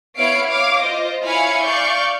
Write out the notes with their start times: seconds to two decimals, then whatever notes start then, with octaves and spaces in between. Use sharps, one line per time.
0.17 B3 E4 C#5 F5 C7 D7
0.47 C#5 F5 D6
0.81 F4 C5 D#5
1.24 E4 C#5 F5 G#5 B5 C#7
1.65 D5 F5 C#6 G6